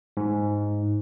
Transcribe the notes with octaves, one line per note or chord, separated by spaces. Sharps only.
G#2